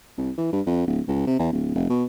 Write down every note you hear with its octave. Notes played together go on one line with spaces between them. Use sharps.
C2
E3
G2
F2
D1
C#2
C3
E2
D1
F1
B2